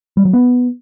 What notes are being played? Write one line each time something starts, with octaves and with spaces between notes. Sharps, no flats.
G3
F#3
B3